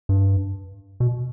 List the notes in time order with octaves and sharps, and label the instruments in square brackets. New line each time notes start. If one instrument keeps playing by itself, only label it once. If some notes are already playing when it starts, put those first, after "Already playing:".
[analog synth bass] G2
B2